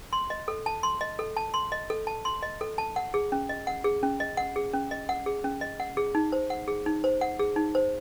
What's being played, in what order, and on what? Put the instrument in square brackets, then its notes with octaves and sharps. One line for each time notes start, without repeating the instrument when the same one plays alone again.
[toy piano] C6
D#5
A4
A5
C6
D#5
A4
A5
C6
D#5
A4
A5
C6
D#5
A4
A5
F#5
G#4
C#4
D#5
F#5
G#4
C#4
D#5
F#5
G#4
C#4
D#5
F#5
G#4
C#4
D#5
F#5
G#4
D#4
C5
F#5
G#4
D#4
C5
F#5
G#4
D#4
C5